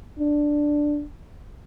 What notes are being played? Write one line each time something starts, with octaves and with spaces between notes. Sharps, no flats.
D4